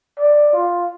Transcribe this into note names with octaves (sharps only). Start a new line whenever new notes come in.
D5
F4